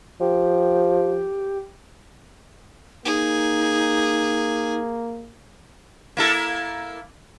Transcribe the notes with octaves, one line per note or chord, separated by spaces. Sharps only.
F3 G4
A#3 D#4 G#4
A#3 E4 A4